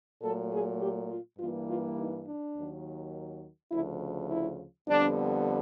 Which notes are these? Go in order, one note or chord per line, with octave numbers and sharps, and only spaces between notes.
A#2 F#3 A3 A4
G#4
G4
F4
G2 E3 G3 A#3 F4
F4
D#4
D4
D#2 D#3 F#3
D2 C#3 F3 E4
E4
F2 D3 G3 B3 D4